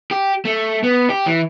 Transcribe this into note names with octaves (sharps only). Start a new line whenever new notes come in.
G4
A3
B3
G4
E3